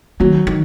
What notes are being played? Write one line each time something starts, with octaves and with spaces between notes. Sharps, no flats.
D#3 F#3
D#3